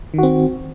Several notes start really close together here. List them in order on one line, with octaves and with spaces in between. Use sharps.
D#3 F#4 C4